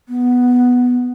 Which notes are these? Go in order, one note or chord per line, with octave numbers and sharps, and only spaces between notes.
B3